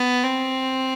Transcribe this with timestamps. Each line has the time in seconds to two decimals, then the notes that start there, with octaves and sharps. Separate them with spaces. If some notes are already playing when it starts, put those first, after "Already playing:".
Already playing: B3
0.24 C4